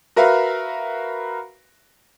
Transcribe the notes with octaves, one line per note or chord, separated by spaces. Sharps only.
F#4 A#4 B4 E5 F5